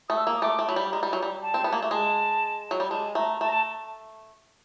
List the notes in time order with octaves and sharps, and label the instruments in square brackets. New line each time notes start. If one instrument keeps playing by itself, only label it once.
[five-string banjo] A3 [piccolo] D#6
[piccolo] E6
[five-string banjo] A#3
[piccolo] D#6
[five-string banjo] A3 [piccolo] D6
[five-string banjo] A3
[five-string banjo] F#3 [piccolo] B5
[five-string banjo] G3
[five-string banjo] G#3 [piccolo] A#5
[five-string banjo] G3
F#3
G3
[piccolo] A5
[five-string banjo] C4
B3
A#3
A3
[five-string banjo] G#3 [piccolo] A5
[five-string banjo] F#3
G3
[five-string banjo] G#3 [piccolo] A5
[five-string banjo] A3 [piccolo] A#5
[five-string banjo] A3 [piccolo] A5
[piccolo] A#5
A5